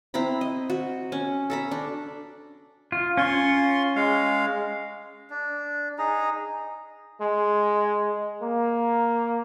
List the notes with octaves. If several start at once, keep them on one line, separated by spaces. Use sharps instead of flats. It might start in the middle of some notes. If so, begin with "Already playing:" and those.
C4 E4 A#5 B5
D#5
F#4
C#4
A4 A#5 B5
D4
F4
C#4 F4 C#5 C6
G#3 F5
D4
D#4 G#4 A#5
G#3
A#3